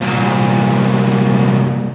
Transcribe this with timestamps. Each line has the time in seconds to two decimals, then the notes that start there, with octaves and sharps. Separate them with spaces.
0.01 C2 A#2